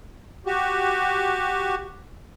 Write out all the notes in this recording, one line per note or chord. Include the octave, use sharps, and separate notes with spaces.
F#4 G4